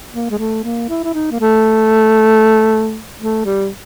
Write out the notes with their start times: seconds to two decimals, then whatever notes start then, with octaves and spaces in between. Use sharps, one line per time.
0.13 A#3
0.31 G#3
0.39 A3
0.64 A#3
0.90 E4
1.04 E4
1.14 D#4
1.31 A#3
1.40 A3
3.20 A3
3.45 G3